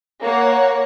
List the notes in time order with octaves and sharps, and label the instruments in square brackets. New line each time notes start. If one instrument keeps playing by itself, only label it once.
[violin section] A#3 C#5 F#5